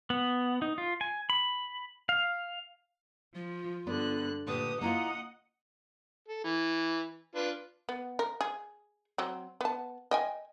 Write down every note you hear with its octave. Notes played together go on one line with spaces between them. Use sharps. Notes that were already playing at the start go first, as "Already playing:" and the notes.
B3
D#4
F4
G#5
B5
F5
F3 F4
G2 D3 B3 D4 F#6
A#2 D3 A3 G4 B4 D#6
A#3 E4 F4 D#5 F#5 A#5 D#6
A4
E3
D4 F4 B4
B3
A#4
G#4
F#3 C4
B3 A5
D#5 G5 G#5